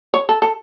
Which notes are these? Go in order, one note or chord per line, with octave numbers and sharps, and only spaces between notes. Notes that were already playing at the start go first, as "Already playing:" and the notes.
C#5
A4
A4